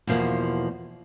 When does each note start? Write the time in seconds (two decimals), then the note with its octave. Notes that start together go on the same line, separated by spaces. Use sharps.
0.07 E2 B2 F3 A#3